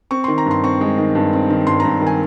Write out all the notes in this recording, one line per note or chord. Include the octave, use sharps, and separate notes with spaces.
C4 C#6
C6
D#3
A#5
G2 C6
C4 C#6
G#3
D#3
G2
C4
D#3
G2 C6
A#5
G2
D#3 G#5